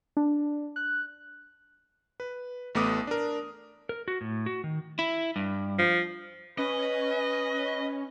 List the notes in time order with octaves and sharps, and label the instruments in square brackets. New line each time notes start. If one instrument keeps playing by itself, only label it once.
[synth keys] D4
F#6
[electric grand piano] B4
A1 A3 B3 D6 D#6
D4 A#4
[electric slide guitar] A#4
F#4
A2
F#4
D#3
[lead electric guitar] E4
G2
[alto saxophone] F3
[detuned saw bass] C#4 [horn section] B4 [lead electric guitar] D#5